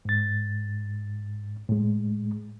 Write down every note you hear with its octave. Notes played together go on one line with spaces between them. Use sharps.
G#2 A6
A2 G#3